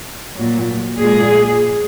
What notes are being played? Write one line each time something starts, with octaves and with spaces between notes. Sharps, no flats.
A#2 F#3
A#2 G#3 G#4